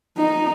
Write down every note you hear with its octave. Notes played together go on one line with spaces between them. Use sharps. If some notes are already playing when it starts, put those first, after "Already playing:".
D#4